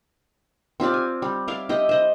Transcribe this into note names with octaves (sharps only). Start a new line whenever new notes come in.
C4 F4 G4 D5
G#5
G3
E4 D5 F5
E4 G4 D#5
C5 D#5